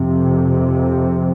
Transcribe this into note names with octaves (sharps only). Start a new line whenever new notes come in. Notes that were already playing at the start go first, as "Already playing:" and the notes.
Already playing: F2 C3